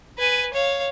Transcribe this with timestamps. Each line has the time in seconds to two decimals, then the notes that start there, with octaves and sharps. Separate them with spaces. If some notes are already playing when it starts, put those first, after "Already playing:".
0.18 B4 G#5
0.53 C#5 F5